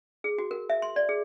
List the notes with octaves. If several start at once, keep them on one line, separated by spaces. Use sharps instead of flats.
G#4
F#4
A#4
E5
C6
D5
G#4